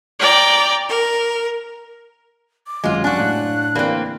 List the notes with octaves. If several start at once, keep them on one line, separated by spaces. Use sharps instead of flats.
D5 G5 A#5
A#4
D6
G#1 F#2 G#3 F4
F#2 D4 F#4 G#5 F#6
A2 F5
E3 A#3 C4 D5 B5